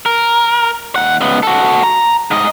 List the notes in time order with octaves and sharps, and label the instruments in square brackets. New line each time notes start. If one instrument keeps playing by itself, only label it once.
[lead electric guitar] A#4
D#2 F#5
C#2 B3
F#4 A4
A#5
G#2 D#5